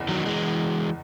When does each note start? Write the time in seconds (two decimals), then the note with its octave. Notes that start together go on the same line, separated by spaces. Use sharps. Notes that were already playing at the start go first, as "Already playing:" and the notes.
Already playing: F#1 E2
0.08 D#3 F#3
0.26 E3 G#3